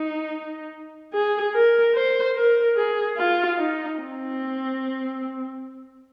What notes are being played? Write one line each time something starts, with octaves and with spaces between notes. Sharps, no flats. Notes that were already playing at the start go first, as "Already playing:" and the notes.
Already playing: D#4
G#4
A#4
C5
A#4
G#4
F4
D#4
C4